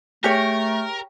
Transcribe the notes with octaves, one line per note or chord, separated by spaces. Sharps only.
A3 G4 G#4 A#4 C#5